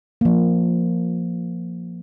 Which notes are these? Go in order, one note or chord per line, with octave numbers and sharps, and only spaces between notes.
F3 A#3